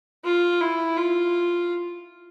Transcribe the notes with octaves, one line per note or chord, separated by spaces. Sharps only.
F4
E4
F4